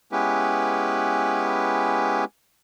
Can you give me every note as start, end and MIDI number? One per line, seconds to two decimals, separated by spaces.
0.12 2.24 56
0.12 2.24 59
0.12 2.24 61
0.12 2.24 64
0.12 2.24 67
0.12 2.24 71